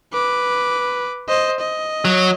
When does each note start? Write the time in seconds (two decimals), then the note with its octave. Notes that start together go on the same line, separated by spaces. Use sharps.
0.13 B4 D6
1.28 C5 D#5
1.60 D#5
2.05 F#3